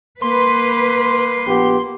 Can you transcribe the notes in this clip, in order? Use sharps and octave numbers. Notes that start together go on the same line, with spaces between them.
A#3 B4 C6
A#1 B3 G4